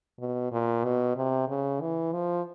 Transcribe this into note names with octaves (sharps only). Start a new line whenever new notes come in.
B2
A#2
B2
C3
C#3
E3
F3